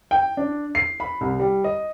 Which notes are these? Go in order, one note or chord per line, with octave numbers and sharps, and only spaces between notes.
G5
D4
C7
B5
C2
G3
D#5